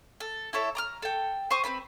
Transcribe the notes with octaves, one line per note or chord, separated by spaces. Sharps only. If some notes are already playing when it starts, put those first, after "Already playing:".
A4
E4 A4 C#5 E5
A#5 D6 F6
A4 G5
C5 C#6 D#6
C4 E4 B4 B5